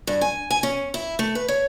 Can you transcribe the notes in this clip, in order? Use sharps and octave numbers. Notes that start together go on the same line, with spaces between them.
G2
G#5
G#5
C#4
E4
A3
B4
C#5